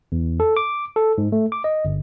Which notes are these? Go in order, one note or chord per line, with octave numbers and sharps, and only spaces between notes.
E2
A4
D6
A4
G#2
A3
D6
D#5
G1